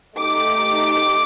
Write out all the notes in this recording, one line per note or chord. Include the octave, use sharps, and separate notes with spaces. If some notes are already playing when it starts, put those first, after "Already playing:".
A3 D#4 G4 D6